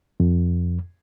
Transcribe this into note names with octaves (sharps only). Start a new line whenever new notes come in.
F2